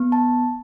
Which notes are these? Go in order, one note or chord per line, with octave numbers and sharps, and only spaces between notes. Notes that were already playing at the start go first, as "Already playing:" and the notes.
Already playing: B3
A5